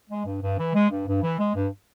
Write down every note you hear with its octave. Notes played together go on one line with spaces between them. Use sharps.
G#3
G2
G2
E3
G#3
G2
G2
E3
G#3
G2